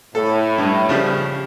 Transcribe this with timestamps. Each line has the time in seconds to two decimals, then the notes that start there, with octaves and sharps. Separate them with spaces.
0.15 A2 A4
0.58 G2
0.89 C#3 F3 G3